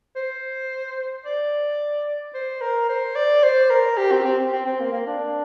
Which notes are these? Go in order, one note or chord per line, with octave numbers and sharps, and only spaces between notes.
C5
D5
C5
A#4
C5
D5
C5
A#4
G4
C4
C4
C4
C4
A#3
A#3
D4